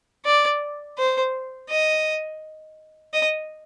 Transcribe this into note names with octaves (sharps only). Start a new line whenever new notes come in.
D5
C5
D#5
D#5